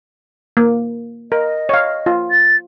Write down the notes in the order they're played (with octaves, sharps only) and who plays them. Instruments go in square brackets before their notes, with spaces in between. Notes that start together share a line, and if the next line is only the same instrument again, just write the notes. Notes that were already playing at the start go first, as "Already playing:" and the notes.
[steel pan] A#3
[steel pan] A#4 [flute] D#5
[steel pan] C#5 F5
F4
[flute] A6